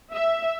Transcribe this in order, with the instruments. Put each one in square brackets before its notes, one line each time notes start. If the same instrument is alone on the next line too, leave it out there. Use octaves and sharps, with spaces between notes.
[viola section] E5